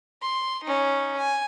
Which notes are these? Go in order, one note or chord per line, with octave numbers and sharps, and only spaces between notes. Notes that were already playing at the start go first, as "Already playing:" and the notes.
C6
C#4 D#4
G#5